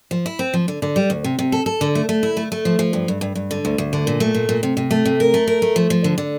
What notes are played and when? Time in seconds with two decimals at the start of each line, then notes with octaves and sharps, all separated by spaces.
0.11 F3
0.26 E4
0.39 C4
0.54 F3
0.68 D3
0.82 D3
0.96 G3
1.10 D2
1.24 C3
1.39 C3
1.52 A4
1.66 A4
1.81 D3
1.95 A3
2.09 A3
2.23 E4
2.37 A3
2.52 A3
2.65 F3
2.79 F3
2.93 G2
3.08 G2
3.21 G2
3.35 G2
3.51 D3
3.65 D2
3.78 D2
3.93 D3
4.07 A#2
4.20 A3
4.35 A#2
4.49 A#2
4.63 C3
4.77 C3
4.91 A3
5.05 C3
5.20 A#4
5.34 A3
5.47 A#4
5.62 A3
5.76 F3
5.90 F3
6.04 D3
6.18 D3